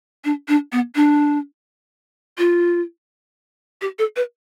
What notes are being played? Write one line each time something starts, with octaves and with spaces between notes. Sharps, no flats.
D4
D4
B3
D4
F4
G4
A4
B4